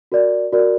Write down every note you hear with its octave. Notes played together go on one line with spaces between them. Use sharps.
F#4 A#4 D5
F#4 A#4 D5